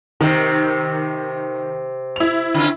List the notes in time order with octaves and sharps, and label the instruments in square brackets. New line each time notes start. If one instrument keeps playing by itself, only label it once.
[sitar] C3 [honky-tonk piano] D#3
[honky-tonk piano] E4 F7
[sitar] D3 C#4 F4